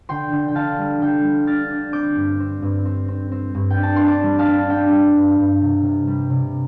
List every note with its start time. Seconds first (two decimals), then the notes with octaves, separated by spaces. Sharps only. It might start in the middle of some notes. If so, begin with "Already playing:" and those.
0.09 D3 G5 C6
0.32 D3
0.48 G5
0.55 D3 F5 A5
0.78 G3
1.01 D3 G5
1.24 G3
1.47 D4 F6 A6
1.71 D4
1.93 C4 D6 G6
2.16 G2
2.40 C4
2.62 G2
2.85 C4
3.08 C4
3.32 C4
3.55 G2
3.70 G5
3.78 D4
3.83 A5
3.96 D4 C6
4.07 A5 D6
4.23 G3
4.39 F5 A5
4.46 D4
4.69 D4 G5
4.92 G3
5.16 G2
5.39 G2
5.61 C3
5.84 C3
6.08 G3
6.30 C3